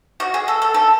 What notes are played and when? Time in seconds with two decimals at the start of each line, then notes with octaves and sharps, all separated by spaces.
0.20 F#4
0.34 G#4
0.48 A4
0.62 A4
0.74 A4